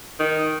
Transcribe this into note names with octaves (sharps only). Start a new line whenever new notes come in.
D#3